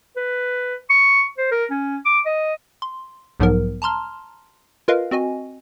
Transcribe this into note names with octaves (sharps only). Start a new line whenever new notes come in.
B4
C#6
C5
A#4
C#4
D6
D#5
C6
B1 G#2 F3 F#3 B3 A#4
A5 A#5 C6 F6
F4 A#4 B4 D#5 F5
C4 F#4 D#5 G#5